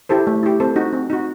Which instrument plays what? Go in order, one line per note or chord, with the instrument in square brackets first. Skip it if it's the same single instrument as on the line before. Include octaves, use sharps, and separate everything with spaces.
[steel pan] E4 G4 A4 C5
A3
E4 G4
C4 A4 C5
D#4 F#4
C4
D#4 F#4